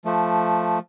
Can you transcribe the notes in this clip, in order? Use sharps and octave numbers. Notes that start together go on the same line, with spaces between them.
F3 A3